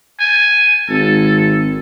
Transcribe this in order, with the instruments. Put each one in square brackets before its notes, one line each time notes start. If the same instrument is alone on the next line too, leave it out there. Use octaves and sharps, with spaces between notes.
[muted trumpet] G#5
[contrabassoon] G#1 [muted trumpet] A4